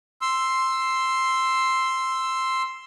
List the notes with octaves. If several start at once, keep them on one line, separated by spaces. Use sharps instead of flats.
C6 E6